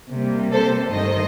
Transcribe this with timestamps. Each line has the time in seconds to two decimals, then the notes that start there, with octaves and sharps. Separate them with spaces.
0.12 C3 G3 A#3
0.52 A4 C5
0.92 G2 D#3 A3 C5 D#5